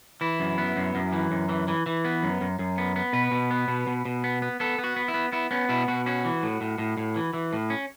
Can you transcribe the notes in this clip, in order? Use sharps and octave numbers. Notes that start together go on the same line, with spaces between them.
E3 E4
F#2
B3
F#2
F#2
E3
F#2
E3
E3
E3
B3
F#2
F#2
F#2
B3
B3
B2 B4
B2
B3
B2
B2
B2
B3
B3
B3 A4
B3
F#4
B3
E4
B3
B3 E4
B3 C#4
B2 E4
B2 F#4
C#4 F#4
E3
A2
A2
A2
A2
E3
E3
A2
C#4